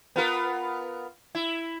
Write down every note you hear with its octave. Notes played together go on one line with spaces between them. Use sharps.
B3 F4 A#4
E4